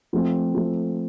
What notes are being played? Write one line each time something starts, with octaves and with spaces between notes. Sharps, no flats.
F3 A3 C4
F3 A3 C4